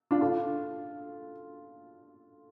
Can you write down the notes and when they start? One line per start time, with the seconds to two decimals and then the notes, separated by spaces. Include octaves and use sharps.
0.11 D4 F4
0.21 F4 A4